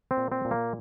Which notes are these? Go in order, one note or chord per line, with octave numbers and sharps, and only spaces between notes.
C4
A#2
C4
A#2
A#3